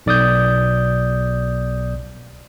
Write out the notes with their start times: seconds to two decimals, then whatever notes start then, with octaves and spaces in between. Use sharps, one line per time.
0.06 B1 D5 D#6 G6